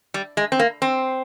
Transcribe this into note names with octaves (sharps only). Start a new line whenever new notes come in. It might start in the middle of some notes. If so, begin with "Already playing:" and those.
G3
G#3
C4
A#3
C4